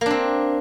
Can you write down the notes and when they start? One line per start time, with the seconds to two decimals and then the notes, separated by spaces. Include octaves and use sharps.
0.01 A#3
0.06 D4
0.11 C4